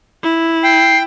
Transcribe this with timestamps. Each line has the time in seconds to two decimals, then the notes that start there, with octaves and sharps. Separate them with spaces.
0.23 E4
0.63 G5 C7